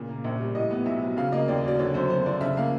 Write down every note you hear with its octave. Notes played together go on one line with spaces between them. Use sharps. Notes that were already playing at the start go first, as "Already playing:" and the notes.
Already playing: A#2 C#3
A#3
A#1
G3
A2 D#5
B3
B1 E5
F#3
C#3 F5
A#3 D#5
D#2 D5
F#3 D5
D3 C#5
F#2 C5
F#2 C5
F3 D5
C#3 E5
A#3 F5